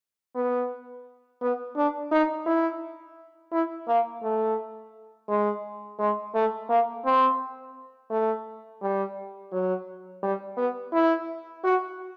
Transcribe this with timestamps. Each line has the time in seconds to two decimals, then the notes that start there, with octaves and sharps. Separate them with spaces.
0.35 B3
1.41 B3
1.76 D4
2.11 D#4
2.46 E4
3.52 E4
3.88 A#3
4.23 A3
5.29 G#3
5.99 G#3
6.34 A3
6.69 A#3
7.05 C4
8.11 A3
8.82 G3
9.52 F#3
10.23 G3
10.57 B3
10.93 E4
11.64 F#4